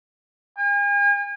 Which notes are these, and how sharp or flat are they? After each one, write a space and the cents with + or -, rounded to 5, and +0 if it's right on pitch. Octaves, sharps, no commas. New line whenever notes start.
G#5 -40